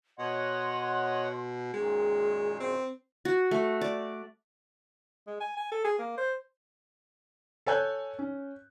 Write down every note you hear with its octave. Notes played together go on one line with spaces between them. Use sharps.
B2 C#5 D#5 F#5 C6
F#2 A#2 D#3 G#3 G#4
C4
F#4
A3
D5
G#3
G#5
G#5
A4
G#4
A#3
C5
A4 C#5 G#5 F#6 G6
C#4